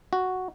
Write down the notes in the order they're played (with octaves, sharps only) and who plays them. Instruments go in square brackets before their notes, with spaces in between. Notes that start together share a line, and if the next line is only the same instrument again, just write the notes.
[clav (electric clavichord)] F#4